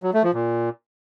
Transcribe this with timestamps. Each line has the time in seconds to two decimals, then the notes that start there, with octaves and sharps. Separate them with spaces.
0.03 F#3
0.13 A3
0.24 F3
0.34 A#2